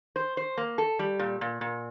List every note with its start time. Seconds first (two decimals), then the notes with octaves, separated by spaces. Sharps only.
0.16 C5
0.37 C5
0.58 A#3
0.78 A4
0.99 G3
1.19 A#2
1.41 A#2
1.61 A#2